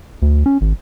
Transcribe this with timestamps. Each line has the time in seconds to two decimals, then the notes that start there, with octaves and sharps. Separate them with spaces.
0.22 D2
0.46 C#4
0.61 G#1